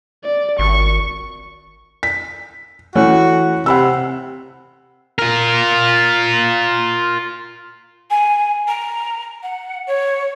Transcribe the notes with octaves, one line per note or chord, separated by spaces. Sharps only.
D5
G#1 C#6
B6
E3 A3 C#4 F#4
C3 F#5 B5 E6
F4 A#4
G#5
A#5
F#5
C#5